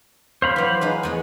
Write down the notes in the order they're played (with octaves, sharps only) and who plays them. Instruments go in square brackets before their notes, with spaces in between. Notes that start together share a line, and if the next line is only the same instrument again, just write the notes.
[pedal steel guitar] C5 F5 B5
[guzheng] E3 F#3
G#3 D#4 B4
E2 G#3 C#5